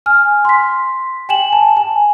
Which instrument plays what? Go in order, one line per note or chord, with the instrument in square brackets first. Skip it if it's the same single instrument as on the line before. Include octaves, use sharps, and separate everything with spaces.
[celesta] G#5 F6
C6 B6
G5 G#5 E7 F#7
A5
G#5